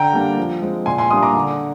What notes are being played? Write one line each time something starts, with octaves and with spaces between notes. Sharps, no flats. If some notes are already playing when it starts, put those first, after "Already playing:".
Already playing: D3 G5 A#5
G3 A#3 D4
F3
G#3 C4
A#2 G#5 C6
G#5 C6
G3 A#3 D4 C6 D#6
A#5 D6
D3